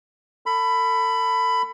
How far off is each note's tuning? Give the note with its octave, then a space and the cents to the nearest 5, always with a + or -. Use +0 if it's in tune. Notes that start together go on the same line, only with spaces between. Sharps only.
A4 +35 B5 +15